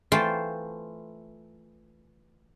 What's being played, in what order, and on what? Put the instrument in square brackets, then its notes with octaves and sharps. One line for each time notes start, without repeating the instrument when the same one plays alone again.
[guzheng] E3 A3 F4 C5 G5 A5